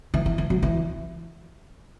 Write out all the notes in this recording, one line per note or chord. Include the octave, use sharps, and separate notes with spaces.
E3
E3
E3
F#3
E3